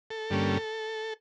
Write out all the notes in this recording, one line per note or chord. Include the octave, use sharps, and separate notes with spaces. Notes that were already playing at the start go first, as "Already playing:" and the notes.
A4
G2 D3 G3 A#3 C#4